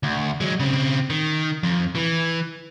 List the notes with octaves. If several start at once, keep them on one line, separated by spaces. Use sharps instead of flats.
D2
F#3 G#3
C#3 C4
D#3
F2
E3